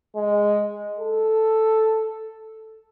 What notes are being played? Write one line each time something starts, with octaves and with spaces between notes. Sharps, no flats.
G#3
A4